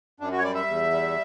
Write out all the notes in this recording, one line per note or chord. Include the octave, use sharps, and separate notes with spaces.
F#2 D4
F#4
C#5
G3 D5
E5
E2
G3